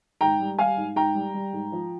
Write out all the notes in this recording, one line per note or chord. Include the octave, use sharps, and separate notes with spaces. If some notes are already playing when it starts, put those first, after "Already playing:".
G#2 G5 A#5
G3
G3 F5 G#5
G#2
G#2 G5 A#5
G3
G3
G#2
F3